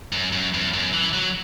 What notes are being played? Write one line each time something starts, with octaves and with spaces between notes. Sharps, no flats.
F#2
F#2
E2
F#2
E3
F#3